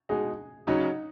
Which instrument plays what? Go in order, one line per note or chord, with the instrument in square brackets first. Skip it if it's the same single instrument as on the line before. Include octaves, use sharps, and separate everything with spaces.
[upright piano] B2 G#3 D#4 F#4 [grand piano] G#4
[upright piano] C#3 F#3 C#4 F#4 [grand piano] D#4